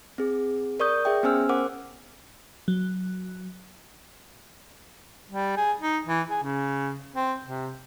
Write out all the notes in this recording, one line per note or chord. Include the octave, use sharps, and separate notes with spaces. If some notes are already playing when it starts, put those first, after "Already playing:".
C4 G#4
A#4 D5 C#6 D#6 G6
G#4 E5 G5
B3 C#4 C5 G#5 E6 F6
A#4 C5 F#5 D6
F#3
G3
G#4
D#4
E3
G#4
C#3
C4
C3